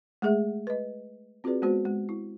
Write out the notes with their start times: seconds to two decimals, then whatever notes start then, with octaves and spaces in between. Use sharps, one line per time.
0.22 G#3 A3 G#4 E5
0.67 B4 D#5
1.44 C4 F4 F#4 G#4 B4 D5
1.62 G#3 B3 F#4 C5
1.85 G#3
2.09 E4